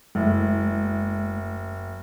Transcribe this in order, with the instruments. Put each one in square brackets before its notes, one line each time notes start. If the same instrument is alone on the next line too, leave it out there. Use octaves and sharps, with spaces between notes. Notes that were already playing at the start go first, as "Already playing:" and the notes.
[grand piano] F#1 E4 [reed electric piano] G#3 A3